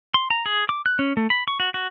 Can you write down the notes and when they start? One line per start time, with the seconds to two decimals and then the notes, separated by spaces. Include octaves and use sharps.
0.14 C6
0.30 A#5
0.46 G#4
0.69 D6
0.86 F#6
0.99 C#4
1.17 A3
1.30 B5
1.48 C#6
1.60 F#4
1.74 F#4